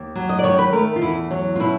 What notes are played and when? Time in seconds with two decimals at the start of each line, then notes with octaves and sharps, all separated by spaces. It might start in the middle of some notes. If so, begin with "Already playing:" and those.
Already playing: D#2
0.15 F#3
0.29 D#5
0.39 D5
0.44 D#3 C#5
0.59 B4
0.73 A3 A#4
0.96 F4
1.02 E2 E4
1.31 F#3
1.56 F4
1.60 B2 E4